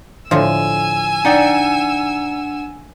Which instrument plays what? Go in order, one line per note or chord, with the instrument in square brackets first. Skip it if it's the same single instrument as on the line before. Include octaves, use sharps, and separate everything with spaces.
[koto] A2 D3 F3 [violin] G#5 E6
[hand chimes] D4 F#5 C#7 [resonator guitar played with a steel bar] D#4 D5 G5